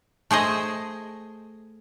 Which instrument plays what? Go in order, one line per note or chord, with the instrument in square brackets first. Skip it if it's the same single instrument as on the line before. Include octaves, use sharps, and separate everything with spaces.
[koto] A3 G#4 C5 D#5